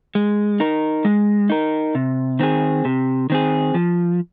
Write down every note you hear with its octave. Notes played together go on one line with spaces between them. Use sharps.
G#3
D#4 A#4
G#3
D#4 A#4
C3
D#3 C4 G#4
C3
D#3 C4 G#4
F3